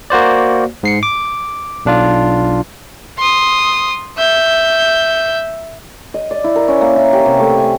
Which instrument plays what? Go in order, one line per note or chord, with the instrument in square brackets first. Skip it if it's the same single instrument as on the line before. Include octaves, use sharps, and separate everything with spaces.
[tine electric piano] A#3 F#4 C5 D5
G#2 C7 C#7
D6
B1 D4 F4
[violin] C6 D#6
E5 G6
[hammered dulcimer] D#5
D5
E4
A#4
C#4
A#3
E4
G4
C3
A3
G#5